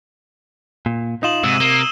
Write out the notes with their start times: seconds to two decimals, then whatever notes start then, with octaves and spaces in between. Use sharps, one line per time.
0.86 A#2
1.23 D#4 F4 D#6 E7 F#7
1.44 G#2 C3 E6 D#7
1.60 A#3 E7 G7